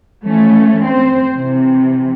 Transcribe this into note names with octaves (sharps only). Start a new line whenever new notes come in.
E3 F3 A3 C#4
C4 C5
C3 E3